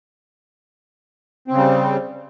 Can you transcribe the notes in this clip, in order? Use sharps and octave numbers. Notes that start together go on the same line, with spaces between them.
C#3 G3 C4